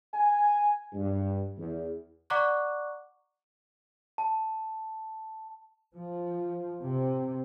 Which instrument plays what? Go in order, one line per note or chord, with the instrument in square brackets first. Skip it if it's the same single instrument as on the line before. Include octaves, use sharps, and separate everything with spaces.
[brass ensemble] G#5
G2
E2
[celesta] D5 F#5 A#5 C#6 D6 F#6
[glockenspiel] A5
[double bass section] F3
C3